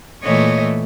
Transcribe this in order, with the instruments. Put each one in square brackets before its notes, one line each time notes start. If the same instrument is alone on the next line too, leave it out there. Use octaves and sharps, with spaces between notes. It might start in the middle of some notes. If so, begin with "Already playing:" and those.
[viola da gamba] A#2 E3 A3 [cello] C#5 D#5